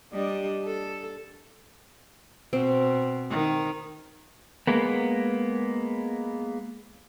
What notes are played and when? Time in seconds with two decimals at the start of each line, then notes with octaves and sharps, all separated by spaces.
0.13 G3 D4 D#5
0.66 A4
2.53 B2 C4
3.30 D#3
4.67 G#3 A#3 B3